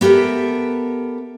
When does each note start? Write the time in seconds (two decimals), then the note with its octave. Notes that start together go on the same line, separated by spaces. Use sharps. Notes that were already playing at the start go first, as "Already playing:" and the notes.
0.01 B3 G4 A4 A#4 E5